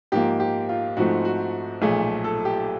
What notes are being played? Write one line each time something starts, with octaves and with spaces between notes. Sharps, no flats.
G#2 F3 A#3 G4
G4
F4
G#2 F3 A3 C4 F#4
F#4
B1 A#2 F3 A3 G#4
A4
G4